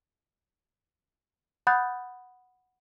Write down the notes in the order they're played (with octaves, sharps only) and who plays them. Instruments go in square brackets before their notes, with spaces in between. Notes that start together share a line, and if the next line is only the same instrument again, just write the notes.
[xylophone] F#5 B5 D#6 F#6 G6 A6